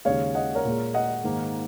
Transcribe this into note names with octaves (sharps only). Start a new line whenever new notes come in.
D#2 C#3 G#3 C#5 F5
D#5 F#5
A#4 C#5
A#2 G#3
D#5 F#5
G#2 D#3 A#3